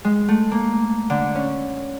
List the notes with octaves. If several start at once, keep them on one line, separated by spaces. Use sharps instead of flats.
G#3
A3
A#3
D3
C#4